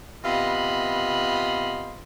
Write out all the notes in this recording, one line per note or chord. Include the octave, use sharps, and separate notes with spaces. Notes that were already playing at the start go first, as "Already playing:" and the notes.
C3 B3 F4 D#5 B5